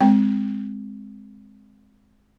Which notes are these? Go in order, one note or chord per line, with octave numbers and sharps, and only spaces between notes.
G#3 C4 G5